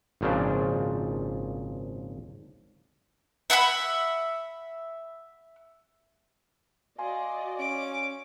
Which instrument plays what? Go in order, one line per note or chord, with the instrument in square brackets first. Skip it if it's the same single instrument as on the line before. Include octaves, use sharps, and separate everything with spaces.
[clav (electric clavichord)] G#1 A#2 C#3 F3 D4
[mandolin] E5 F#5 G#5 B5
[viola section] F#4 D5 D#5 [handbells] F5 G#5 C6
[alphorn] C#4 [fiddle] D6